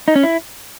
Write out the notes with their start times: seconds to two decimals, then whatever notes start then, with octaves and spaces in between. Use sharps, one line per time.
0.08 D#4
0.15 C#4
0.23 E4